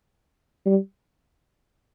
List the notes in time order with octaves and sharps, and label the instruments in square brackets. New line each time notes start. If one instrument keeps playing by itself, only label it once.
[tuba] G3